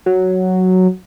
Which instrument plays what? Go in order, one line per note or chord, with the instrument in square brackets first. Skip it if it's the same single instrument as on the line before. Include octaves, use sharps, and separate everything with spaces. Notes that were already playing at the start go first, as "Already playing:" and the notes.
[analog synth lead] F#3